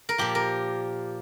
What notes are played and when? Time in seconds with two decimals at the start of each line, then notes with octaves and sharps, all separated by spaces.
0.09 A#4
0.18 A#2 F3 G4
0.35 A#4